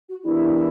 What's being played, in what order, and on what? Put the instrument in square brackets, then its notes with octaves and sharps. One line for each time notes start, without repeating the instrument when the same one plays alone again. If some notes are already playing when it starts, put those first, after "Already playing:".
[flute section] F#4
[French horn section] E3 B3 D4 G4 A#4 [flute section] E4